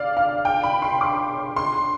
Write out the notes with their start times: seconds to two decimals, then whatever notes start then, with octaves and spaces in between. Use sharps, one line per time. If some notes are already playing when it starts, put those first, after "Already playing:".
Already playing: D5 F5
0.17 F5
0.45 G5
0.63 B5
0.82 C6
1.01 D6
1.56 C6